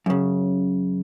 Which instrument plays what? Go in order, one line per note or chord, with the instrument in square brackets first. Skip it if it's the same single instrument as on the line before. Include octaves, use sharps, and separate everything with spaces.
[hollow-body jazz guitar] F#2 C#3